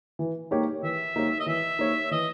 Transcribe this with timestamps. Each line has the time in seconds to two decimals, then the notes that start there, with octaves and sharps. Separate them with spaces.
0.19 E3
0.51 A#3 D#4 G4 C#5
0.83 E3 E5
1.16 A#3 D#4 G4 C#5
1.40 D#5
1.47 E3 E5
1.79 A#3 D#4 G4 C#5
2.11 E3 D#5